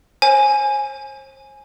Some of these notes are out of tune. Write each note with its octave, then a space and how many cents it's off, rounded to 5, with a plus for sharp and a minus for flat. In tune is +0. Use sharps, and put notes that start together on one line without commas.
C5 +40 G#5 +5